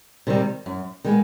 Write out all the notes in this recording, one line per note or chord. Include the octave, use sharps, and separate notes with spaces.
C3 D#3 G3
F#2
D#3 G#3 B3